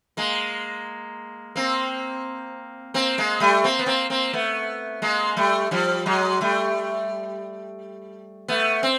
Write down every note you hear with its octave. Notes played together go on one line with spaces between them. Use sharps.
G#3 A#3
A#3 C4
A#3 C4
G#3 A#3
G3 A3
A#3 C4
B3
A#3 C4
A#3 C4
A3 B3
G#3 A#3
G3 A3
F3 G3
F#3 G#3
G3 A3
A3 B3
C4